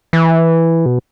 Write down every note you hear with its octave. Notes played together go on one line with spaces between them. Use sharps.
E3
B2